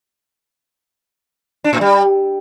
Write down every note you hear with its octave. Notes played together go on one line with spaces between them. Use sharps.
D4
A2
G3